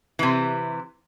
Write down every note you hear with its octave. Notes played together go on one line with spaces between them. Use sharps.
C3 E3